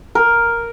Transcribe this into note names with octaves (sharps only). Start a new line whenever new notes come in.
A#4